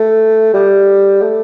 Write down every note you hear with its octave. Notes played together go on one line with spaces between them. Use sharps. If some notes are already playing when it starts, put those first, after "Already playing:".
Already playing: A3
G3
A3